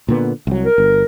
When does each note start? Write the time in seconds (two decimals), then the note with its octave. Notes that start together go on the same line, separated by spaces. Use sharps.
0.09 A#2 D3 B3
0.47 C2 F#3
0.65 A#4
0.78 G1